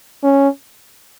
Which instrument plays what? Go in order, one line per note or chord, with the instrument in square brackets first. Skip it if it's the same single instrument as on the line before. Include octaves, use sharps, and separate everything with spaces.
[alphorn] C#4